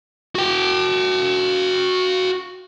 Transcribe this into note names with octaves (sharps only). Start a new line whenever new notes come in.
F#4 G5